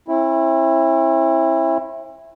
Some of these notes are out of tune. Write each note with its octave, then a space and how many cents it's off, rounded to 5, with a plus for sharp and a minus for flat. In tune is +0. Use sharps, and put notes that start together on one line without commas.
C4 +45 E4 +0